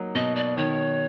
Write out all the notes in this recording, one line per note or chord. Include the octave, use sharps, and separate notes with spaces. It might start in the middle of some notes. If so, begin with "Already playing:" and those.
Already playing: F#3 A#3 D#4
B2 D#5
D5
D#3 C#5